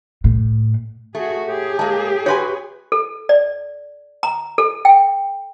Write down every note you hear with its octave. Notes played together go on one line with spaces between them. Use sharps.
A2
A3 F#4 G#4
A2 G4 G#4
G#3 A#3 A5
F#4 B4 C#5 E5 G#5 C6
A4
D5
A#5
A4
G5